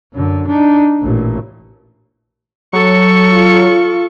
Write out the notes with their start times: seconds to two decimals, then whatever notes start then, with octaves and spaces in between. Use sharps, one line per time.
0.14 F#2 D3
0.47 D4 D#4
1.01 A1 A#2
2.73 F#3 A4 C#6
3.32 F4